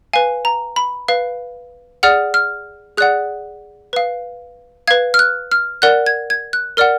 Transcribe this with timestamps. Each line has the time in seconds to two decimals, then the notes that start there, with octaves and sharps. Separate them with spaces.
0.13 B4 F5 G#5
0.45 A#5
0.76 B5
1.08 B4 F5
2.03 G#4 D5 F#5 F6
2.34 F6
2.97 G#4 D5 F#5 F#6
3.93 B4 F5
4.88 B4 F5 G#6
5.14 F6
5.19 F#6
5.52 F6
5.82 A#4 D5 F#5 F#6
6.06 G#6
6.30 G#6
6.53 F#6
6.77 A#4 D5 F#5 F6